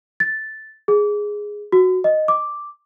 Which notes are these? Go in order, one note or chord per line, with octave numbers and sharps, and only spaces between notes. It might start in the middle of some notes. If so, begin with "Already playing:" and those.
A6
G#4
F#4
D#5
D6